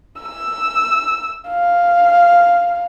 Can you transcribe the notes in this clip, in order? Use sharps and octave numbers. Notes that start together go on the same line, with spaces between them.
E6
F5